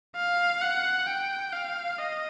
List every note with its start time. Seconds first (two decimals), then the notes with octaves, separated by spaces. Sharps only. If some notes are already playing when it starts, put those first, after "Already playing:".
0.16 F5
0.62 F#5
1.07 G5
1.53 F5
1.98 D#5